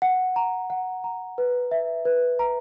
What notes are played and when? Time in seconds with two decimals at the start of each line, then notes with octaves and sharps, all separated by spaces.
0.02 F#5
0.36 A#5
0.70 F#5
1.04 A#5
1.38 B4
1.71 E5
2.05 B4
2.39 A#5